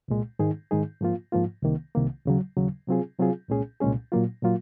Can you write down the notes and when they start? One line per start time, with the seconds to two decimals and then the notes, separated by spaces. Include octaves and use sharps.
0.08 C2 A#2 G#3
0.39 G#2 D#3 G#3 D#4 G#4
0.71 G#2 D#3 G#3 D#4 G#4
1.01 G#2 F3 A#3 F4
1.32 G#2 F3 A#3 F4
1.63 C2 C3 D#3 A#3
1.95 C2 C3 D#3 A#3
2.25 D#2 C#3 F#3
2.57 D#2 C#3 F#3
2.87 C3 F#3 C4 F4 G#4
3.18 C3 F#3 C4 F4 G#4
3.49 C2 A#2 G#3 C#4 G#4
3.80 C2 A#2 G#3 C#4 G#4
4.12 A#2 F#3 A#3 F4
4.42 A#2 F#3 A#3 F4